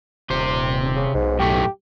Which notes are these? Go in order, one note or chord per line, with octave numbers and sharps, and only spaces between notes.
D#1 C3 C5
C#3
B1 G#2
F#2 A2 A3 G4